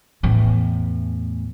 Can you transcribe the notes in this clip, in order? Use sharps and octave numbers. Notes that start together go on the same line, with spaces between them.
E2 A2